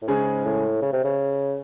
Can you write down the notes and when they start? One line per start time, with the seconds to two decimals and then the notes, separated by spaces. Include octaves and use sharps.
0.02 A2
0.08 G#2 C#3 G#3 C#4 G#4
0.45 A2
0.82 C#3
0.93 C3
1.04 C#3